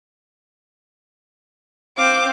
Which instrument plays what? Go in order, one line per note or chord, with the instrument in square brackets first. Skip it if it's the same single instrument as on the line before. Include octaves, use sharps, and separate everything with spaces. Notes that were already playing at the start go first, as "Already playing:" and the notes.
[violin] C4 [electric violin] F5 G6 [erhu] D6